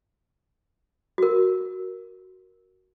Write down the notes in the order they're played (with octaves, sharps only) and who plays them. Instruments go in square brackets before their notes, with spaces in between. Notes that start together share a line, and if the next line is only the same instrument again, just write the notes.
[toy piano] F#4 A#4